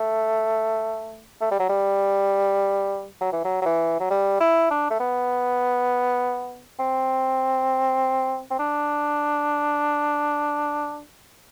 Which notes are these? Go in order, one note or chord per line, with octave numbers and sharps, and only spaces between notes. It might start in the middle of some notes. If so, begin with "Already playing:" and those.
Already playing: A3
A3
G3
F#3
G3
F#3
E3
F#3
F#3
E3
F#3
G3
E4
D4
A3
B3
C4
C4
D4